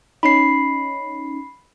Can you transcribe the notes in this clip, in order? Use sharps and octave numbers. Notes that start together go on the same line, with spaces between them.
C#4 D#4 B5 C7